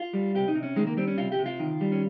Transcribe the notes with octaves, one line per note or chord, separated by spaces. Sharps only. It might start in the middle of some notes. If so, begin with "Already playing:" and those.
Already playing: F4
G3
C3 G4
D#4
C3
C#4
D#3 G#3
A#3
G3 C4
C#4
C3 F4
G4
C3
F4
D#3
G3
C#4